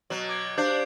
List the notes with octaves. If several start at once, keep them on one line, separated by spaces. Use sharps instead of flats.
B2 F#3
D6 G#6 D7
D4 G4 C5 F5 D6 G6 C7